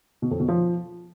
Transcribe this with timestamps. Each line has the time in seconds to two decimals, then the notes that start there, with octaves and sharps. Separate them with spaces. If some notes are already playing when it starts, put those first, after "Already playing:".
0.22 B2
0.31 F2
0.40 B2
0.48 F3